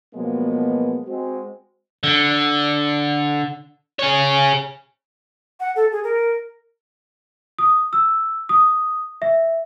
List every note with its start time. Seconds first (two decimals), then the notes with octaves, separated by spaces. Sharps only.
0.14 B2 F3 F#3 G#3 A#3 B3
1.07 G#3 C4 F#4
2.03 D3
3.99 G#4 C#5
5.60 F#5
5.76 A4
5.92 G#4
6.04 A#4
7.59 D#6
7.93 E6
8.49 D#6
9.22 E5